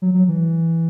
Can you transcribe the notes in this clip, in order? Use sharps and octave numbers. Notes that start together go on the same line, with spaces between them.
F#3
F#3
E3